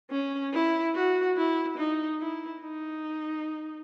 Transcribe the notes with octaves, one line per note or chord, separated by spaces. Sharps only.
C#4
E4
F#4
E4
D#4
E4
D#4